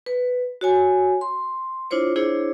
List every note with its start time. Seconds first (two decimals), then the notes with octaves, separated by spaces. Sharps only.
0.06 B4
0.61 F#4 C#5 G#5
1.21 C6
1.91 D4 E4 F4 C5 C#5
2.16 D4 E4 G#4 C5 C#5